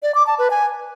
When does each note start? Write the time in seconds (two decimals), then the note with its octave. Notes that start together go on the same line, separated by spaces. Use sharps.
0.03 D5
0.15 D6
0.27 A5
0.39 B4
0.50 G#5